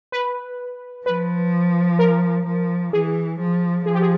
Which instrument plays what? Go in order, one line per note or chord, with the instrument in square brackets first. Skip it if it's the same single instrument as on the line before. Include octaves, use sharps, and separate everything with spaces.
[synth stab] B4
[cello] F3 [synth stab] B4
[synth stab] A#4
[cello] F3
[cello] E3 [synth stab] G#4
[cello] F3
[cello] F3 [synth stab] G#4
[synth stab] G4
G#4